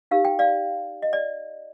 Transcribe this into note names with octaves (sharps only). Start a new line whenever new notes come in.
D#4 G4 A#4 F5
G5
D5 F5
D#5
D5